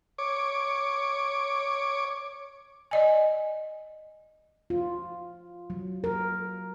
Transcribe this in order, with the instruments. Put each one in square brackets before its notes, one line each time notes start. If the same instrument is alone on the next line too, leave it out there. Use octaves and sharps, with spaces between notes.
[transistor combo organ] C#5 D6
[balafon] D5 D#5 G#5
[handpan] F4
F#3
A#4